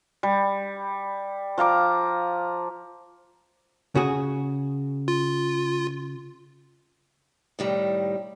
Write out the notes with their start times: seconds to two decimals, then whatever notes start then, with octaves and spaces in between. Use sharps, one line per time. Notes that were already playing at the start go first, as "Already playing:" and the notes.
0.23 G3
1.58 F3 F5 A#5 D6
3.95 C#3 F#4 G#4
5.08 F4
7.59 A2 D#3 G3